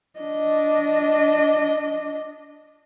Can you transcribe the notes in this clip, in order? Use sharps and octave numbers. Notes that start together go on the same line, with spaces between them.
D4 D#5